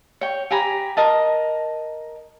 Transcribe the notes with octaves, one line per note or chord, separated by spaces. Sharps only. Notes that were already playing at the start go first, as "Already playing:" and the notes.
C#5 G5
G4 G#5 A#5 B5
A#4 D#5 A5